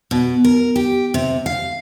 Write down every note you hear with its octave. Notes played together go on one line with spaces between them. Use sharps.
B2
A#4
G4
C3
F5